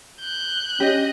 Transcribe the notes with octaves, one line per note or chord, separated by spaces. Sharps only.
F#6 G6
C#4 D4 G4 D#5